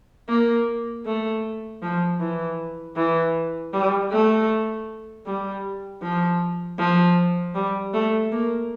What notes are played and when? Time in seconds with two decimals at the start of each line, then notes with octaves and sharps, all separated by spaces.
0.29 A#3
1.06 A3
1.82 F3
2.20 E3
2.96 E3
3.73 G3
4.11 A3
5.26 G3
6.02 F3
6.79 F3
7.55 G3
7.94 A3
8.32 A#3